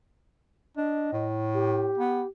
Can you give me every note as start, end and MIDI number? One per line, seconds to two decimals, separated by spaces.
0.77 1.09 62
0.77 1.26 75
1.13 1.92 45
1.54 2.27 67
1.98 2.22 59